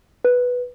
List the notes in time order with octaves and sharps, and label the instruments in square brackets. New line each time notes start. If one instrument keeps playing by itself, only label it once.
[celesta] B4